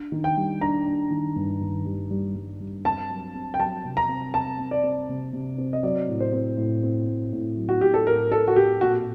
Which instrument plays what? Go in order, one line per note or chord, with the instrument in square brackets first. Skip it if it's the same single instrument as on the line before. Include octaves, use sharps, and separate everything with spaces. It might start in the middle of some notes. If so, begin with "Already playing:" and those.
Already playing: [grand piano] D4
D#3
[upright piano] G5
[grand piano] G3
[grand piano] D4 [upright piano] A#5
[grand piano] D4
D#3
G2
D#3
G3
G3
G3
G3
[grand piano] C4 [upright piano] A5
[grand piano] F#3
C4
[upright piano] G5
[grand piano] F#3 [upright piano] A5
[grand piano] C3
[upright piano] A#5
[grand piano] C4
[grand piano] C4 [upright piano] A5
[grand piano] C4
[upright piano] D5
[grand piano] C4
C3
C3
C4
[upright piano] D#5
[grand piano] F#3 [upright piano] D5
[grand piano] A2
[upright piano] C5
[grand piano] C4
A2
C4
A2
A2
F#3
[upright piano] F#4
[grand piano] A2 [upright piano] G4
[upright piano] A4
[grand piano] A2 [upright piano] A#4
[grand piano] A2 [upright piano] A4
[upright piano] F#4
[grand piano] C4 [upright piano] G4
[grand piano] A#2 [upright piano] F#4